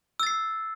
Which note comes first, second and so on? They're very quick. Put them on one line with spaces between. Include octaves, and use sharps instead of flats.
E6 A6 C7